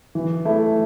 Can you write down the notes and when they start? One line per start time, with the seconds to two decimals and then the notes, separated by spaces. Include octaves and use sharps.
0.15 E3
0.45 A3 E4